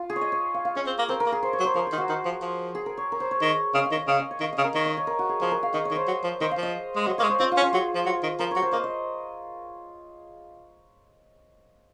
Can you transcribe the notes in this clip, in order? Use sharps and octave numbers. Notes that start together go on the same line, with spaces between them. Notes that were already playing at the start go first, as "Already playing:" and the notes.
Already playing: F4
G#4
C#5
D#5
C#5
F5
F5
C#4 D#5
C4
A#3
C4 A#4
A#4
A#3
G#4
C5
C#5
F#3
C5
F3 A#4
G#4
D#3
F#4
D#3
F3
F3
G#4
A#4
C#5
A#4
C5
C#5
D#3
C#3 D#5
F5
D#3
D#5
C#3 F5
D#5
C#5
D#3 F5
D#5
C#3
A#4
D#3 C#5
D#5
C#5
A#4
F#4
G#4
F3 G#4
A#4
F5
D#3 D#5
C#5
D#3
C5
F#3
F3
D#3 C5
F5
F3
D#5
G#3
F#3 D#5
A#3 C#5
G#3
C5
C4 F4
F4
C#4
F4
F#3 G#4
F3
F#3
D#3
F3 A#4
C#5
F#3
C5
A#3 D#5
D#5